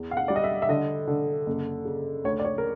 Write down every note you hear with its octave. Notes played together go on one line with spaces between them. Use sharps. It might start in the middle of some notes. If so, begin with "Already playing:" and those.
Already playing: E2
F5
F#5
G3 D5
D#5
E5
E5
D3 D#5
D3
F#1
C#3
D2 C#5
D5
C#5
A#4